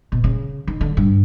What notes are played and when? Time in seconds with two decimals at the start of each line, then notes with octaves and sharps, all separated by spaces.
0.12 B2
0.24 C#3
0.67 D#3
0.81 D3
0.97 G2